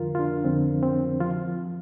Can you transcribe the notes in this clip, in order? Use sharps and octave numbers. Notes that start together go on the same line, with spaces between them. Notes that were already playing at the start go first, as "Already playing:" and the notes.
Already playing: F2 D3 F3 F4 A#4
F4
D4
F2 D3 F3 C4
C4
F3 F4